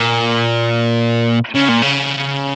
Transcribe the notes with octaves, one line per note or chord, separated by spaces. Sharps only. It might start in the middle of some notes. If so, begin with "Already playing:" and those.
Already playing: A#2
C#3
A#2
C#3